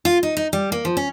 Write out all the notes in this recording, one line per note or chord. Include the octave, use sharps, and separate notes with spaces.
F4
D#4
D#4
G3
A#3
F3
C#4